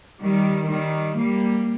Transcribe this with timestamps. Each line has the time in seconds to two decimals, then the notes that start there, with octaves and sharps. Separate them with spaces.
0.21 D#3 G3
0.69 D#3 G3
1.17 G3 A#3